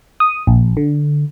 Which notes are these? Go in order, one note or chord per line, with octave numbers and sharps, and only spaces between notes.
D#6
A#1
D3